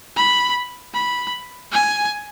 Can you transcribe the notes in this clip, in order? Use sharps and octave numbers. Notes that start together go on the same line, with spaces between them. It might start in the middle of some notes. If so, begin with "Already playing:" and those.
B5
B5
G#5